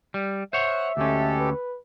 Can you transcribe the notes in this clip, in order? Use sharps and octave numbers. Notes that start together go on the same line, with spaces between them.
G3
C5 C#5 E5 F#5 F#6
D2 G#3 C#4 G4 A4
B4